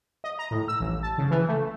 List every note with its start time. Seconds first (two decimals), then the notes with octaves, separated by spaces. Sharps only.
0.24 D#5
0.39 A#5
0.51 A2
0.68 E6
0.80 A1
1.03 A5
1.18 C#3
1.31 E3
1.48 A3